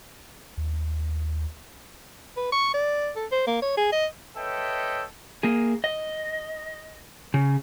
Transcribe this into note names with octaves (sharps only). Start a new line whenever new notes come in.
D#2
B4
C#6
D5
A4
C5
A#3
C#5
G#4
D#5
A4 B4 C#5 D#5 E5 G5
A#3 G#4
D#5
C#3